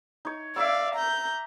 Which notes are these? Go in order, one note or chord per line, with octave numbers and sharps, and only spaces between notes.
D#4 C#5
D5 E5 F5 D6 E6
A#5 G6